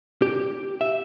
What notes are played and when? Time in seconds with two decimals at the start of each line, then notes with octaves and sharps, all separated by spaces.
0.22 G4
0.81 E5